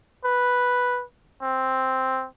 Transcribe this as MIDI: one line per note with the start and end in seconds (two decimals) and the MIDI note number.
0.25 1.03 71
1.42 2.26 60